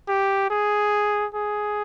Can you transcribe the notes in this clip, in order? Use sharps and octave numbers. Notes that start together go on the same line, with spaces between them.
G4
G#4
G#4